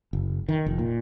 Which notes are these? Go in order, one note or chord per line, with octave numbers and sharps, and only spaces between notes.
F#1
D#3
F1
A#2